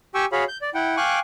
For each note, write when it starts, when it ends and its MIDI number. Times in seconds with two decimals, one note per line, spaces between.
0.15 0.25 67
0.15 0.25 79
0.15 0.25 80
0.15 0.25 85
0.15 0.25 88
0.32 0.44 66
0.32 0.44 68
0.32 0.44 73
0.32 0.44 77
0.32 0.44 83
0.48 0.57 91
0.62 0.70 74
0.74 0.96 64
0.74 0.96 78
0.74 0.96 79
0.97 1.19 77
0.97 1.19 79
0.97 1.19 80
0.97 1.19 85
0.97 1.19 86
0.97 1.19 90